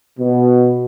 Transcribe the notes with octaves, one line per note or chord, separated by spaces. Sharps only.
B2